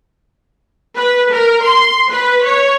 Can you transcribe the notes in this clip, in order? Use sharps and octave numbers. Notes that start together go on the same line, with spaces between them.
B4
A#4
C6
B4
C#5